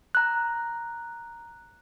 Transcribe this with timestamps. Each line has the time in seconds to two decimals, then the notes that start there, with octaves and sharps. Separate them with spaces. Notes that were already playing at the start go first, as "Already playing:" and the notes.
0.15 A#5 F#6